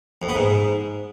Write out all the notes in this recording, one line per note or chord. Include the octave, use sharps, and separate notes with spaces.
F2
B3
G#2